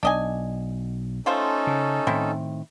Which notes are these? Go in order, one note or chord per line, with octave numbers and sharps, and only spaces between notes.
B1 D4 D#5 G#5
A3 C#4 D#4 F4 A4 C5
C#3
A2 D#3 C4 E4